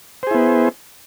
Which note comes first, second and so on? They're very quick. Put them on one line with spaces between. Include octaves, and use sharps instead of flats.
C5 G#4 E4 B3